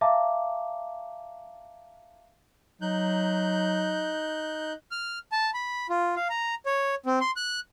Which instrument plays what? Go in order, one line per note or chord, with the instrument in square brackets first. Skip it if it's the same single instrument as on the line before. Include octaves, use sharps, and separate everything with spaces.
[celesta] E5 F5 A5 A#5 D6
[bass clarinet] F#3 [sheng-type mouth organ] D#4 F#6 G6
[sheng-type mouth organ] F6
A5
B5
F4
F5
A#5
C#5
C4
C6
F#6